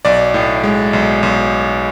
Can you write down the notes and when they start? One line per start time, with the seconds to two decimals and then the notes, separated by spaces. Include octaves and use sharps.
0.05 B1 D5
0.34 A2
0.64 G#3
0.93 B1
1.23 B1